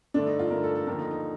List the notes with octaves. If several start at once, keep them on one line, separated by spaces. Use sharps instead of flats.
G2 D3 A3 D4
D#4
F4
G2 D3 A3 A#4
A4
A4
D#2 D3 F3 A#4
D#4
D#4